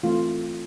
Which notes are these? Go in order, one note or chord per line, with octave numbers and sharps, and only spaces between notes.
E3 A3 C4 F4